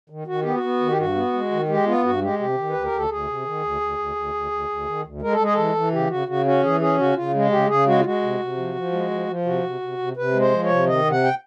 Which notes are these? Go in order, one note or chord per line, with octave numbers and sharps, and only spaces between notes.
D#3
D#3 F#4
B3 G4
F#4
B3
D#3
G4
G2 F#4
B3
G#3
D#3
G#3 G4
B3 F4
G2 F#4
G#3 G4
C3 G4
D#3
D2 B4
A#4
D2 A4
D2 G#4
C3
D#3
D2
D2
D2
D2
D2
D2
D2
D#3
D2
G#3 A#4
A4
G#3 G#4
E3 A4
E3
C#3 G4
C#3 F#4
C#3 F#4
C#4 F#4
E3 G#4
C#4 G#4
C#3 F#4
C#3 F4
G#3
C#3 G4
C#3 G#4
G#3 F#4
F4
G#3 F#4
C3
C3
F3
F3
G#3
F3
F3
C3 F#4
C3
C3
C3
C3 B4
G#3
C5
F3
C#5
C3
D#3 D#5
C3
F#5
G5